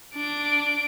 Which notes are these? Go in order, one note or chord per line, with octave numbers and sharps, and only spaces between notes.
D4 D7